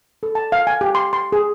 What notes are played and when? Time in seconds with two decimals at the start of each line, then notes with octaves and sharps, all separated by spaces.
0.23 A4
0.35 A5
0.52 F5
0.67 G#5
0.81 G4
0.95 C6
1.13 C6
1.32 G#4